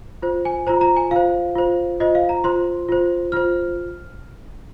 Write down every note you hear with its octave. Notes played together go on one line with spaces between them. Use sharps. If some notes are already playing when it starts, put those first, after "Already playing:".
F4 C5
G#5
F4 C5 A#5
A#5
G#5
F4 C5 F5
F4 C5
F4 C5 D#5
F5
A#5
F4 C5 C6
F4 C5
F4 C5 F6